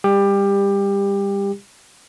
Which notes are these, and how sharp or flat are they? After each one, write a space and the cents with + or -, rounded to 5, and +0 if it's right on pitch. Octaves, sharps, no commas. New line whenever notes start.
G3 +30 G4 +20